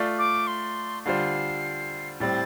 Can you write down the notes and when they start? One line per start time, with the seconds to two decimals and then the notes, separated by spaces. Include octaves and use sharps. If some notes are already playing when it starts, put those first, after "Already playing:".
Already playing: A3 F4 D5
0.19 D6
0.47 C6
1.05 D3 G3 F4 C5 C7
2.20 A2 G3 C4 A6